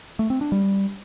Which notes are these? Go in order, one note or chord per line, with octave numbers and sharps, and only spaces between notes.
A3
C4
D4
G3